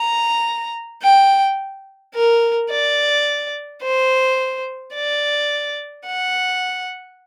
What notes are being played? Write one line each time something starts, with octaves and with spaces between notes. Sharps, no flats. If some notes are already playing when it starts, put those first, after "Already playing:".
Already playing: A#5
G5
A#4
D5
C5
D5
F#5